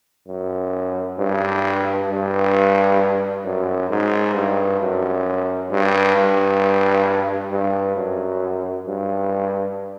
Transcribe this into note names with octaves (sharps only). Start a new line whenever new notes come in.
F#2
G2
G2
F#2
G#2
G2
F#2
G2
G2
G2
F#2
G2